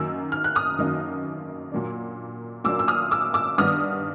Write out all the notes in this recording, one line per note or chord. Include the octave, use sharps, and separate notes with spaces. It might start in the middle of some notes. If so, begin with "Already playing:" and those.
Already playing: F#2 D#3 F#3 A#3 D#4 E6
F6
F#6
D#6 F6
F#2 D#3 F#3 A#3 D#4
A#2 F#3 A#3 D4
A#2 F#3 A#3 D4 D6 E6
E6
D#6 F6
D6 E6
D6 E6
G2 D#3 G3 B3 D4 D#6 F6